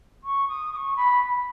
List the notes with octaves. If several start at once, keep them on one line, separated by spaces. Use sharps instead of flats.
C#6
D#6
D#6
C#6
B5